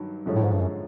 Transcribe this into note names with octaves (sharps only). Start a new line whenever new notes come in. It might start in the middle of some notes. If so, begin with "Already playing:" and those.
Already playing: G2 D#3 F#3
F#2 D3 F3 G#3 C#4
A2
G#2
G2
F#2